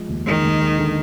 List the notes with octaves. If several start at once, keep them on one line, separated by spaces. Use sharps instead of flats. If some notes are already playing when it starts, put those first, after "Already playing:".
Already playing: F3 G#3
D#2
D#3 G#3
D#2
G#3
D3